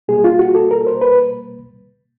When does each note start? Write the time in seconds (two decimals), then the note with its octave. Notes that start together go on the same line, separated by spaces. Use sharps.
0.08 B2 G3 A#3 G#4
0.24 F4
0.39 F#4
0.55 A4
0.71 A#4
0.87 C5
1.01 B4